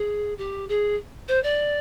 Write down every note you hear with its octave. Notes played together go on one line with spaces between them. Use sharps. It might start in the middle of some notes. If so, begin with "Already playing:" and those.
Already playing: G#4
G4
G#4
C5
D5